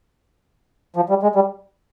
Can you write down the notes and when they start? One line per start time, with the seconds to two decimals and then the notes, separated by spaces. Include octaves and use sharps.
0.96 F3
1.09 G3
1.23 G#3
1.35 G3